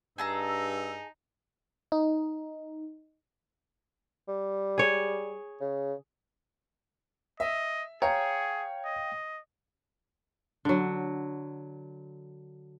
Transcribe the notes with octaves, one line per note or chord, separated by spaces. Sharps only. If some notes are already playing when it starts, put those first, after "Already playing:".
G2 D#4 G#4 A5 A#5 E6
D#4
G3
G#4 C#5
C#3
D#5 E5
G#4 C#5 F5 G5 A#5
D#5
D3 F#3